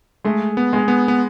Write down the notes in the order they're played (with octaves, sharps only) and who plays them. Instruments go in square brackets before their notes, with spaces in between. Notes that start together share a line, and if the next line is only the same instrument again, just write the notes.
[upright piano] G#3 [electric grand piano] A3
[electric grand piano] B3
[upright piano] G#3
[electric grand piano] B3
B3